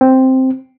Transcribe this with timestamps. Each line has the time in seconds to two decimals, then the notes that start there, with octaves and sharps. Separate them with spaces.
0.01 C4